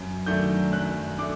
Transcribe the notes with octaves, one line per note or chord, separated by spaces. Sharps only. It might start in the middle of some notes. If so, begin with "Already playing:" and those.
Already playing: F#2
D#3 F#3 A3 D4 G6
F#2 F#6
A3 D4 D6